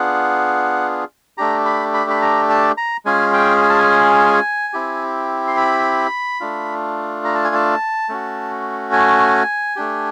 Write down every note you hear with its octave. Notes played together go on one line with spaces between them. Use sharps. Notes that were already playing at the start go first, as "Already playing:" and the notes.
Already playing: B3 D4 F4 G#4 F#5
A3 D4 G4 A#5
B5
B5
B5
A#5
A5
A#5
G#3 C#4 F4 G#4 G#5
G5
G#5
A5
G#5
C4 E4 G4
C6
B5
A3 D4 F4
A#5
A5
G#5
A5
A3 C#4 F#4
G#5
A3 D4 G4